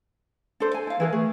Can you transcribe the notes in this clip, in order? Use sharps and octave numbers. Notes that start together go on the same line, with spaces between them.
D4 A4 C5
G#5
E4 F5
E3 E4 G#4 A#4
A3 G#4